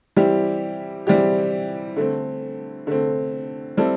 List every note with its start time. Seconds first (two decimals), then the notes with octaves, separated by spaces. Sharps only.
0.17 E3 G3 C4 E4 G4
1.07 E3 G3 C4 E4 G4
1.96 D3 A3 C4
2.87 D3 A3 C4
3.77 G3 C4 E4 A4